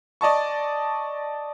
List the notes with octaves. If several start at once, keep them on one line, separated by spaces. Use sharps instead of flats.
D5 D#5 A5 C#6